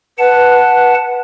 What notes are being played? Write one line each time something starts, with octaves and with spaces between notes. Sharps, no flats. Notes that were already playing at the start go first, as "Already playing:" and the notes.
B4 F#5 A5